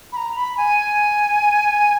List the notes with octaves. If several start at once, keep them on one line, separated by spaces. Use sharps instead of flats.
B5
A#5
B5
G#5